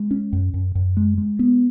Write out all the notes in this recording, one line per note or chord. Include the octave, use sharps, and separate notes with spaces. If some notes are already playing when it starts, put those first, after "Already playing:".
Already playing: G#3
C#4
F#2
F#2
F#2
G#3
G#3
B3